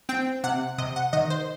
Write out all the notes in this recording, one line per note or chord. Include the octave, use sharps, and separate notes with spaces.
C4 G5
C3 F#5
C3 D#5
F#5
D#3 D#5
C5